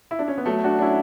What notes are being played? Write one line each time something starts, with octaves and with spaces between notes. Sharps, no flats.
E4
D4
C#4
B3
F#3 A3
D4 F#4
D4
C#4 E4